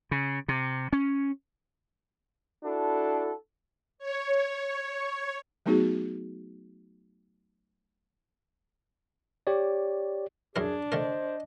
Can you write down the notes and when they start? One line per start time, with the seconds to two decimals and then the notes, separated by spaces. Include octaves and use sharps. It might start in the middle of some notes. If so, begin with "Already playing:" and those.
0.11 C#3
0.48 C3
0.93 C#4
2.64 D4 E4 F#4 A4
3.98 C#5
5.66 F#3 A3 B3 D#4 F#4 G#4
9.47 G4 C#5 D5
10.56 F#2 D4 E4 G#4 A#4
10.92 D3 A3 A#4 C5 D#5